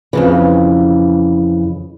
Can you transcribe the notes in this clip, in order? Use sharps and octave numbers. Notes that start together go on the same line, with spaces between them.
F2 C#3 E3